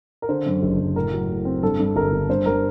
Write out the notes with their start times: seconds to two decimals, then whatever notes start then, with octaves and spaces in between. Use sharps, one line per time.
0.22 A#4
0.29 D3 C5
0.46 F#2
0.63 F#1
0.79 F#1
0.95 A2 A#4
1.13 F#3
1.29 A2
1.45 C4
1.63 G2 A4
1.79 G2
1.96 G1 A#4
2.12 G1
2.29 G2 C5
2.46 G3 A#4